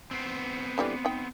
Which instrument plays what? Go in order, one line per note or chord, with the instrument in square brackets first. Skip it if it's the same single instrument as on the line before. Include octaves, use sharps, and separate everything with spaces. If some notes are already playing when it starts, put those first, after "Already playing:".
[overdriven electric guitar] B3 C4
[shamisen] D3 E3 G3
D#4 G5